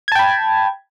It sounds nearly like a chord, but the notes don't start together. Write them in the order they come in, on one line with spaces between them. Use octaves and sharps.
G#6 A5 G5 B5